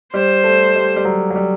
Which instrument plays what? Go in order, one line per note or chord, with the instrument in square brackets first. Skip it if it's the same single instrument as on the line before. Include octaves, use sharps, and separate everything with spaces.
[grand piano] G3 [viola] C5
[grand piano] A3
G3
G3
F#3
F#3
G3